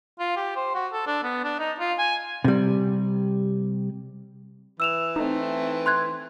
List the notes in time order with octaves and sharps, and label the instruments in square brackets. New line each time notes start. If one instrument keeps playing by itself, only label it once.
[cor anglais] F4
G4
C5
F#4
A4
D4
B3
D4
D#4
F4
G#5
[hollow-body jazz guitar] C3 G3
[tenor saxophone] E3 [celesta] E6 E7 F7
[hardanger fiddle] A3 C4 [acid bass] D#4
[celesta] C6 F#6 G#6